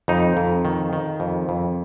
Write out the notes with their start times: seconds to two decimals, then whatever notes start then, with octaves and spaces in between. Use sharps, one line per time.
0.08 F2 D#4
0.37 F2
0.65 D#3
0.93 D#3
1.20 F2
1.49 F2